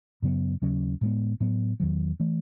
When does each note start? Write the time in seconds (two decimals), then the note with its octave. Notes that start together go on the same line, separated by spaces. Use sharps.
0.22 F#2 C#3 F#3 B3
0.62 D#2 C#3 F#3 C#4
1.01 A2 G#3 B3
1.40 A2 F#3 B3
1.80 E2 D#3 F#3
2.20 E3 A3